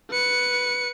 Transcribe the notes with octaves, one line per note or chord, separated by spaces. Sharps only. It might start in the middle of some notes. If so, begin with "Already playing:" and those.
B4 C#7